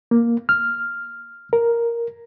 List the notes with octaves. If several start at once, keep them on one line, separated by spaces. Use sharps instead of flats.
A#3
F6
A#4